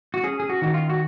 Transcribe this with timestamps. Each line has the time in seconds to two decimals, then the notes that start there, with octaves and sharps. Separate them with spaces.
0.14 F#4
0.23 C#4 G#4
0.40 G#4
0.49 F#4
0.62 D#3 F#4
0.74 F4
0.90 F#4